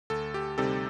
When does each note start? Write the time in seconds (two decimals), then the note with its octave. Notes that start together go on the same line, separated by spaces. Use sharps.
0.10 D2 A4
0.34 G4
0.58 C3 G3 C4 D#4 A4